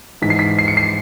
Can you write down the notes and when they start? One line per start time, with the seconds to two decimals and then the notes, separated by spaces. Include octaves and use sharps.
0.22 G#2 E3 B6
0.30 C7
0.39 B6
0.59 C7
0.68 C#7
0.77 C7